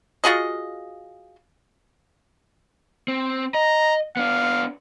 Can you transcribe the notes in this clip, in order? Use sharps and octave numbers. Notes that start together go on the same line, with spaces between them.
F4 F#4 G#4 D#5
C4
D#5 A#5
B3 D4 F5